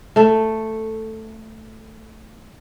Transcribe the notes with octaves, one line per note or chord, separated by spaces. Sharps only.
A3 A4